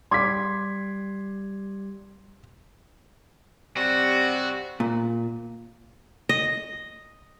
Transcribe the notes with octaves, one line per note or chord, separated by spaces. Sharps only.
G3 G4 C6 D6 G#6 B6
C3 G3 C4 F#4
A#2
D#5